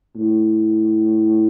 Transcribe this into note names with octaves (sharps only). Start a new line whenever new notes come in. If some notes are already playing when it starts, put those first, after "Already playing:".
A2